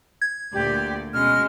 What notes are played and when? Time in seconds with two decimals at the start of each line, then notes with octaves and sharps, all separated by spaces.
0.22 G#6
0.54 D2 A#2 G4 D5
1.14 B2 G#3 C#4 F6